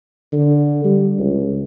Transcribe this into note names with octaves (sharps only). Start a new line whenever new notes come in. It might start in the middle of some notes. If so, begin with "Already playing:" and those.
D3
G3
C#2